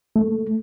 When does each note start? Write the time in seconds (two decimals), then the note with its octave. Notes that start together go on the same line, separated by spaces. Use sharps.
0.16 A3